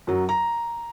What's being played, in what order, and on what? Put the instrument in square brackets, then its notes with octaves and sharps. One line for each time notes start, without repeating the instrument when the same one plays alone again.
[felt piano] F#2 F#3
A#5